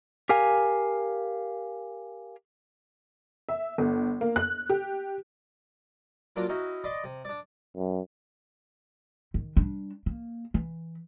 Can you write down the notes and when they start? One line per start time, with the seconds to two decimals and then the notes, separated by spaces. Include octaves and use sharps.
0.29 G4 A#4 F5 G#5
3.49 E5
3.78 G1
4.21 A#3
4.36 F#6
4.70 G4
6.36 F#3 A#3 D4 F4
6.49 C#4 D#4 E4 F#4
6.84 D5 D#5 B5 C6
7.04 C3
7.25 D4 D5
7.76 F#2
9.34 D#3
9.56 G3 D4
10.06 A#3
10.54 E3